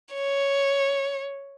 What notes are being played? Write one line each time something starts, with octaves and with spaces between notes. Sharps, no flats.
C#5